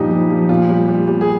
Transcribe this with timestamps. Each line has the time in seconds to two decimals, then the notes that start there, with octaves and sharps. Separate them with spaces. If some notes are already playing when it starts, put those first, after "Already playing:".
Already playing: G2 A#2 F3 G3 D#4 G4
0.11 F3
0.30 F3
0.49 A#2 F4
0.69 G3
0.88 G3
1.08 G3
1.21 G#4